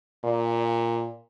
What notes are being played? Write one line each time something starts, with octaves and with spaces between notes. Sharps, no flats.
A#2